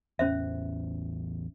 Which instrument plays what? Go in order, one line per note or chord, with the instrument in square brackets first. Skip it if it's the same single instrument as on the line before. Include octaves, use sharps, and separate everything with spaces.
[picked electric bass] A1 E2 [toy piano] C#4 C5 E5